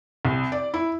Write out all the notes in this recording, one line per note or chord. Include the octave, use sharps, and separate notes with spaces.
C2
D5
E4